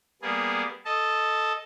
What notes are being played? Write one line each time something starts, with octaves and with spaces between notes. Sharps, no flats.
G3 A#3 B3 G#4
A4 D#5 A5